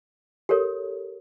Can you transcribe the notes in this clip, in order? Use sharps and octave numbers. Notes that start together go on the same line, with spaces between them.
G4 A4 A#4 C#5